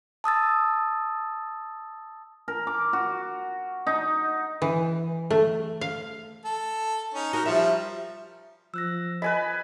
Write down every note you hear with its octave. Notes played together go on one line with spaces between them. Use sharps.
A5 D#6 E6 A6
A#4
D6
F#4
D#4
E3
A3
F5
A4
C#4 D#4
D#4 F#4 A#4
F3 G3 E5
F3 E6 F#6 A#6
B4 D#5 G#5 B5